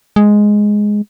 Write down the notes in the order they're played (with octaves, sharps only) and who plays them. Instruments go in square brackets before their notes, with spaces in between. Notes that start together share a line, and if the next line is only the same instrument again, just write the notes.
[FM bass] G#3